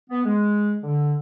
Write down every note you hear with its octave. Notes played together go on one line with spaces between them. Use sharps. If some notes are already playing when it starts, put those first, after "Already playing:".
B3
G#3
D3